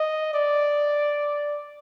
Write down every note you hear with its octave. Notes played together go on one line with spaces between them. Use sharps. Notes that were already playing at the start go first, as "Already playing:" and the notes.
Already playing: D#5
D5